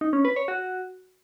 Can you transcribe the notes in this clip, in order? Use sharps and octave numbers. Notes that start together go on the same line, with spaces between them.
D#4
C#4
B4
C#5
F#4